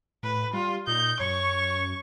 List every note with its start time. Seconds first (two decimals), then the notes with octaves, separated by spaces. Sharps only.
0.23 A2 B4
0.53 G3 F4
0.87 A#2 D#4 G6
1.20 F#2 C#5 C#6